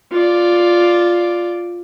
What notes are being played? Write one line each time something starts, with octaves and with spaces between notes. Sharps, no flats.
F4 D5